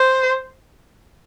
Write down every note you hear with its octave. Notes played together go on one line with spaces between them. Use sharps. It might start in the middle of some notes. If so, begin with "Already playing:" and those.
Already playing: C5